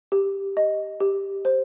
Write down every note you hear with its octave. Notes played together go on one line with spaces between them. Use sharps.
G4
D#5
G4
C5